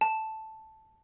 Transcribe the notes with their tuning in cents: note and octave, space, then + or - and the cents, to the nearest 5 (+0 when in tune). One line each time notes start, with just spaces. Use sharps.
A5 -5